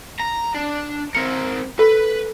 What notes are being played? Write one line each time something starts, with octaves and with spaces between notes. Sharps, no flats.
A#5
D4
C4 A#4 C#7
A4 B4